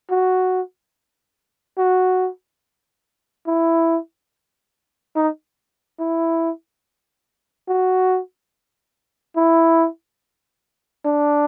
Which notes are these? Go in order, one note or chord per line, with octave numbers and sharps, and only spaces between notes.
F#4
F#4
E4
D#4
E4
F#4
E4
D4